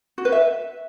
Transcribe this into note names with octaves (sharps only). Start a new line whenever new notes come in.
F#4
B4
E5